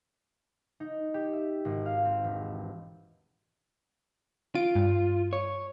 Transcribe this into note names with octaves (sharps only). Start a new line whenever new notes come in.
D#4
G4
E5
G#1
F5
C4
E1
F4 D7
G2
C#5